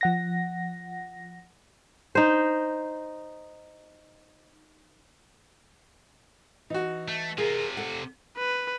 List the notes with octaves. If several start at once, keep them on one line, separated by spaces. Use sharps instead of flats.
F3 F#5 A#6
D#4 C5
E3 D#4 F#4
A3
C3 F4 G#4 A#4
A4 F#5
B4